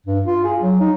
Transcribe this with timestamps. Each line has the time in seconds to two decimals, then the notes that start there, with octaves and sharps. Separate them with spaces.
0.06 G2
0.27 F4
0.45 G#4
0.61 F#3
0.81 D#4